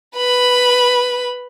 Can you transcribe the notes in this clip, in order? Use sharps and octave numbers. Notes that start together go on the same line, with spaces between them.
B4 B5